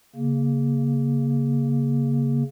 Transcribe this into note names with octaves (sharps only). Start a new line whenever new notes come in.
C#3 A#3